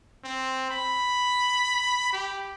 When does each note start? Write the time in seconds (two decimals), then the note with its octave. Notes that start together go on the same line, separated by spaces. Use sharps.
0.24 C4
0.71 B5
2.13 G4